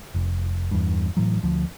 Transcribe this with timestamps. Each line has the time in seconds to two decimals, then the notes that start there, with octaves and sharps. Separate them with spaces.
0.15 F1
0.71 E2 G2
1.17 A2 E3 F#3
1.43 D2 F3